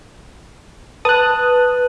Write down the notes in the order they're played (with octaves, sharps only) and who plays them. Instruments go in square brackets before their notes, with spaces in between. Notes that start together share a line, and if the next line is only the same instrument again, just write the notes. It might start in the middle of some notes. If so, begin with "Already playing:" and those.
[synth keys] B4 [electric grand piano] A5 [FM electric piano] D#6 F#6